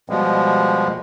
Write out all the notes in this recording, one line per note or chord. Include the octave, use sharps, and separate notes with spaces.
B2 F3 G3 G#3